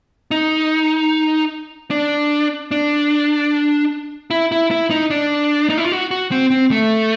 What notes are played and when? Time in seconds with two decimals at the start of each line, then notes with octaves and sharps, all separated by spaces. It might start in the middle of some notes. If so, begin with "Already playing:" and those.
0.31 D#4
1.91 D4
2.71 D4
4.31 E4
4.52 E4
4.71 E4
4.91 D#4
5.10 D4
5.70 D#4
5.77 E4
5.84 F4
5.92 F#4
6.11 F#4
6.31 C4
6.51 C4
6.71 A3